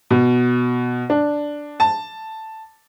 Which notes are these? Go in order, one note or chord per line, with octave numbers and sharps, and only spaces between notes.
B2
D4
A5